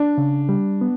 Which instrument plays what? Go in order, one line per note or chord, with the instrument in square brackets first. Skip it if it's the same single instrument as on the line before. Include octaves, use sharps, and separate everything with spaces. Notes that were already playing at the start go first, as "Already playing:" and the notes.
Already playing: [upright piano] D4
[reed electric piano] C#3
G3
B3